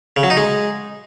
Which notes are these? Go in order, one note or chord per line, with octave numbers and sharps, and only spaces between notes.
C#3
F#3
D#4
G#3